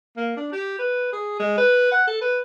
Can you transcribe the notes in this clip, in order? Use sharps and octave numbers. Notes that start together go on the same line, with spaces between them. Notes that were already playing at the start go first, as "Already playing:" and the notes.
A#3
D4
G4
B4
G#4
G#3
B4
F#5
A4
B4